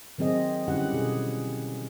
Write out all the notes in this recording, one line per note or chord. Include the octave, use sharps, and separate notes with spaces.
D#3 F#3 C4 G#4 D#5
D3 G3 C#4 E4 G4 F#5
B2 G#4